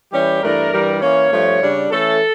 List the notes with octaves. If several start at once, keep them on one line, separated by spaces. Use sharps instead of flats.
E3 G3 C#4 G4
G2 E3 A3 D4 A#4
G2 E3 G3
E3 A#3 C#4 C#5
G2 F3 A3
C#3 G3 D4
E3 A3 C#4 A4